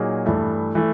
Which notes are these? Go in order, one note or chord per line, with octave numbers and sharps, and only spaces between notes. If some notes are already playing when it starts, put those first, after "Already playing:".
Already playing: A#2 F#3 A#3 D#4 G#4
G2 E3 A3
E3 A3